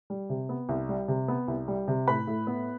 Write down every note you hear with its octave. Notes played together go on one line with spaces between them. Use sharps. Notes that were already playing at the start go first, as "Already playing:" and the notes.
G3
C3
B3
C2
G3
C3
B3
C2
G3
C3
A2 B4 B5
A2
B3